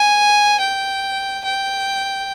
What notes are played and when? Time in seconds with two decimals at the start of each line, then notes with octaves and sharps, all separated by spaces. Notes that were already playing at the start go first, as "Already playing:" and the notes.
Already playing: G#5
0.60 G5
1.44 G5